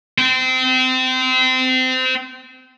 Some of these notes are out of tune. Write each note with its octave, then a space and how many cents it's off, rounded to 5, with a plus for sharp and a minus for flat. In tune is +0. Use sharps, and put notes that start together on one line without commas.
C4 -25